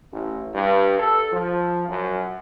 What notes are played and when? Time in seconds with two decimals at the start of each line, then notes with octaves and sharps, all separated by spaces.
0.12 A1
0.54 G2
0.99 A4
1.31 F3
1.88 F#2